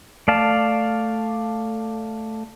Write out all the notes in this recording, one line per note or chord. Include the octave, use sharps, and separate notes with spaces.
A3 D5 F5 A5